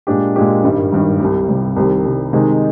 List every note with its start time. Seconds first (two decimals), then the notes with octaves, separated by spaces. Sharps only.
0.07 A#2 G#3 D4 G4
0.36 A#2 G#3 D4 G4
0.63 G#1 G2 D#3 G3
0.92 G#1 G2 D#3 G3
1.20 C2 C3 G3
1.49 C2 C3 G3
1.76 C2 C3 D#3 G3
2.05 C2 C3 D#3 G3
2.33 C3 D#3 G#3 D#4